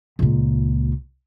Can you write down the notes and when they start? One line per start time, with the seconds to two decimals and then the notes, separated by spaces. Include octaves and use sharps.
0.19 C#2 A#2